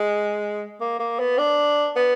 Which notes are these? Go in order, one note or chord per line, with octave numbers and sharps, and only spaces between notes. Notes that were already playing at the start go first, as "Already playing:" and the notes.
Already playing: G#3
A#3
A#3
B3
D4
B3